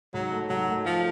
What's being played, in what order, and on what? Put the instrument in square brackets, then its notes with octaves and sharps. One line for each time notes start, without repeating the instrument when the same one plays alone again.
[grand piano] G#2 [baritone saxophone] F#3
[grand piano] A3
[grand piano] G#2 [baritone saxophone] F#3
[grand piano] A3
[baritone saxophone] F3 [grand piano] A3